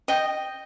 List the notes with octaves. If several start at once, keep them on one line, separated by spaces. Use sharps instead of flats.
D#5 G5